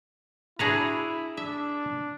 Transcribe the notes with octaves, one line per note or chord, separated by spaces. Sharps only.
D4 E4 F#4 G#4 B4 A#5
D4 E5